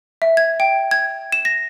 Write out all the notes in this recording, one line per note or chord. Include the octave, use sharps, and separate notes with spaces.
E5
G#6
G5
G#6
E7
A#6